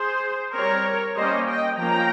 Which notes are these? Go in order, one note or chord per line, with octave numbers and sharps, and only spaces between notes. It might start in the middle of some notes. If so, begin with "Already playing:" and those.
Already playing: G#4 C5
G3 C4 A#4 C#5
G3 A#3 C#4 C5 D#5
D#5 G5
F3 A#3 C#4 G5 A#5